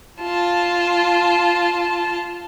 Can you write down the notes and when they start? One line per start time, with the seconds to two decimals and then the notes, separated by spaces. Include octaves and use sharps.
0.21 F4 A5